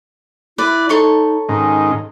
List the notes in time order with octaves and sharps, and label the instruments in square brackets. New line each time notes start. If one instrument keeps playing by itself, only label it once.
[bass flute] E4 [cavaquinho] B4 D5
[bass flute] D#4 [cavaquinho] A4 C#5 C6
[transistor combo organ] G#2 D#3 [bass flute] C#4